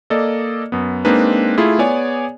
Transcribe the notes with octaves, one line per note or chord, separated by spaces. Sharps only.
A#3 A4 D5 D#5
F#2 B3
G#3 A#3 C4 D4 D#4 B4
A3 E4 F4 G#4
B3 G#4 C#5 D5 G#5